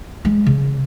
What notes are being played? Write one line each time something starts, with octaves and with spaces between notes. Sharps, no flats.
G#3
C#3